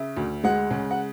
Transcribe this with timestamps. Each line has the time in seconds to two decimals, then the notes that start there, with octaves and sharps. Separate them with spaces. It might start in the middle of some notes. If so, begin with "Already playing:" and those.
Already playing: C#3 E5
0.17 D2
0.44 G#3 F#5
0.70 C#3
0.91 F#5